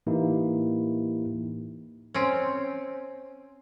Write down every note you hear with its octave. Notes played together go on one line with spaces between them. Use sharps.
A2 E3 A#3 D#4 E4 G4
C4 C#4